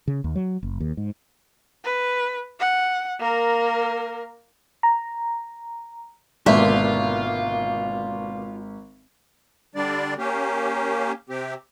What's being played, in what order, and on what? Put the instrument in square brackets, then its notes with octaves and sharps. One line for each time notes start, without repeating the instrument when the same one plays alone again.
[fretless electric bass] C#3
D#2
F#3
F#1
D#2
G#2
[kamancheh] B4
F#5
A#3 A#4
[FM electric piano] A#5
[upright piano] G#1 [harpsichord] B2 D3 A#3 [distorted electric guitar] F4 [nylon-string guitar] E5
[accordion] D3 G3 D4 D5
A#3 C#4 G4
C3 C4 G4